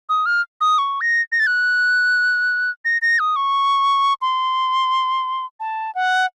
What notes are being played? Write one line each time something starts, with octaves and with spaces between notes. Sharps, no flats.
D#6
F6
D#6
C#6
A#6
A#6
A6
F#6
A#6
A#6
D#6
C#6
C6
A5
F#5